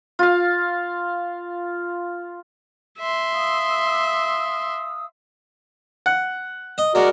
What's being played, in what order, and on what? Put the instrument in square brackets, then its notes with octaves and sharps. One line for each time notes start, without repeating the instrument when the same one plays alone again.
[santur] F4 F5
[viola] E5 C6
[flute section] F5 D#6 E6
[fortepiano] F#5
[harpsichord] D#5
[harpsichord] G#3 [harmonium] F#4 A#4 D5